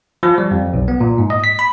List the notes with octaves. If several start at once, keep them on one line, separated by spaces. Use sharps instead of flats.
F3
G3
F2
B1
B3
A#2
G#2
D#5
B6
B5